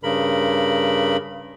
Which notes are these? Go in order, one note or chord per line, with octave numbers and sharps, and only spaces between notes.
G2 C#3 A#4 B5